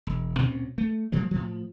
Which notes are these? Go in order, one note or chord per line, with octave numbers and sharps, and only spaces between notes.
E1
D2 A#2 C4 C#4
A3
A2 F3 G3 A#3
A2 F3